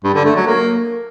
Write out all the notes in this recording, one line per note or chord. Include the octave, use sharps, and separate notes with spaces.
G2
D3
A3
F#3
A#3